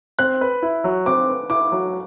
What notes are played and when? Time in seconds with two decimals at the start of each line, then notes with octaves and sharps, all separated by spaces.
0.19 C4 F#6
0.41 B4
0.63 E4
0.84 F#3
1.06 C4 D6
1.28 B4
1.50 E4 D6
1.72 F#3